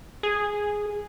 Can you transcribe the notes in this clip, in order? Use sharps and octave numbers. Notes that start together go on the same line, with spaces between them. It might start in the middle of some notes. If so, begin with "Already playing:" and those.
G#4